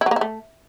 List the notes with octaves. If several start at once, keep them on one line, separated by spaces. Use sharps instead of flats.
E4
F#3
A#3
E4
A3